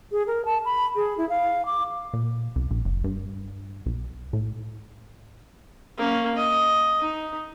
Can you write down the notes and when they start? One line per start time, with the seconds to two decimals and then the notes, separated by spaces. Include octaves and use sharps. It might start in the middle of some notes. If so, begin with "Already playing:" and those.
0.12 G#4
0.27 A#4
0.45 A5
0.65 B5
0.96 G#4
1.18 E4
1.30 F5
1.66 D6
2.13 A#2
2.56 C2
2.71 A#1
2.85 F#1
3.04 G2
3.86 B1
4.33 A2
5.97 A#3 C#4
6.36 D#5
7.00 D#4